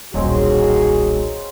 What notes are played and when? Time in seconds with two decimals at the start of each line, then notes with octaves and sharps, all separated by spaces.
0.14 D#1 B1 D#3 F#3 G#3 C4 F#4 G#4